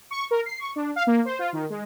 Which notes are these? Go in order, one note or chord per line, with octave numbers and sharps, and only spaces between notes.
C#6
A#4
C7
C#6
D4
F5
A#3
C5
F4
D#3
G#3